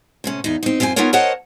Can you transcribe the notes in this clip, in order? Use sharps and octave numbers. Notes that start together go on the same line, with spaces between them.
A2 C3 C#4
E2 D#4
C4 D#4
F#2 C4 F4 G4 G#5
B3 C#4 D#4 F4 A#4 C#5
A#4 C5 C#5 D#5 F#5 A5